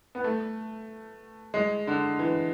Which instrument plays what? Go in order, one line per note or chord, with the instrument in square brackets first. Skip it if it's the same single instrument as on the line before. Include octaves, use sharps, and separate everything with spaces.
[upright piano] B3
A3
G#3
D3
E3